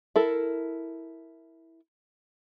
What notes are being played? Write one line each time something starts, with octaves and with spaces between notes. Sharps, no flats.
E4 A4 A#4